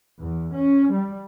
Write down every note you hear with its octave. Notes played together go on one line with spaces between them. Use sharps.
E2
C#4
G3